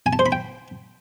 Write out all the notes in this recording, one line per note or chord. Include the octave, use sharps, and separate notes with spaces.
G#5
A5
C5
B5
G5